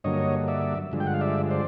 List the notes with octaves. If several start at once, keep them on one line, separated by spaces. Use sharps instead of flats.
G2 D3 F#3 A#3 C#5 D#5
D5 E5
G2 D3 F3 G#3
G5
F#5
F5
D5 E5
C5 D5